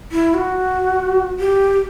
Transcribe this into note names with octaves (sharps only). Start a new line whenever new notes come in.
E4
F#4
G4